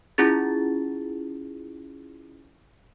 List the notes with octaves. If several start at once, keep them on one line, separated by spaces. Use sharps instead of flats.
C#4 E4 F4 G#4 A6